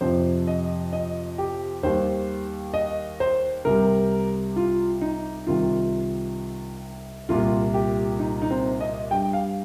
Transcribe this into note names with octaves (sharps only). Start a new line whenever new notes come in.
F2 C3 F3 C5
D#5
D#5
G4
D#2 D#3 G3 C5
D#5
C5
C2 C3 G3 A#4
F4
D#4
C2 C3 D#3 F4
C2 A#2 G3 F4
G4
D#4
D#4
C4
D#5
G2 G3 G5
F5